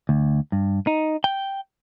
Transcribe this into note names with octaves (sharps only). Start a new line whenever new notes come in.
D2
G2
D#4
G5